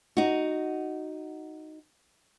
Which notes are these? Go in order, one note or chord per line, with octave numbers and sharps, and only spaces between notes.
D#4 F#4